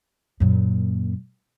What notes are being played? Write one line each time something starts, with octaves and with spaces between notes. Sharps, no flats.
F#2 A#2